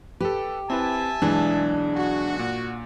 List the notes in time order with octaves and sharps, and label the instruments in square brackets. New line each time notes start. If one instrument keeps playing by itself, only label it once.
[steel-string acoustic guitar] G4 [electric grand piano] A4 B4
[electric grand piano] C4 E4 B4 [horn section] E5 G#5 A5
[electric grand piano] B1 E3 G#3 [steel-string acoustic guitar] D4
[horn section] F#4
[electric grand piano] A#2